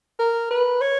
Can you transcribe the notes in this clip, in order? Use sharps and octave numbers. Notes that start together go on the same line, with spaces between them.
A#4
B4
C#5